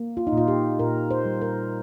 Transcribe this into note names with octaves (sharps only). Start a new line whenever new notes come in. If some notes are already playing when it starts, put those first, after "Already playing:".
Already playing: A#3
F4
D#4
A#2 F4
G4
A#2 A#4
C5
G3
A#4